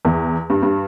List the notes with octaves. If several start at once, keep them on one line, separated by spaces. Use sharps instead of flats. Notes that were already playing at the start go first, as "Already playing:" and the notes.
E2
G2
G2